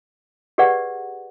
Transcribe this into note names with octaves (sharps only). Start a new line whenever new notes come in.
G4 G#4 B4 D5 F#5